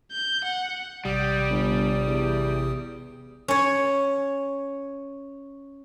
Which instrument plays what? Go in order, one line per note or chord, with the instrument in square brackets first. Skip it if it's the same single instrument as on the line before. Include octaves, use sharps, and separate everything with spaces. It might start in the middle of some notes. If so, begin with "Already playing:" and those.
[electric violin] G6
F#5
[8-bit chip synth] A1 C3 D#6 [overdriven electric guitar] G3
[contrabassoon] G1
E2
[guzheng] C#4 C#5